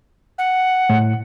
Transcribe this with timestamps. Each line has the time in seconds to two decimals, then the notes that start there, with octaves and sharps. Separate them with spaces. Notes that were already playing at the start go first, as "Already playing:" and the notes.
0.38 F#5
0.90 A2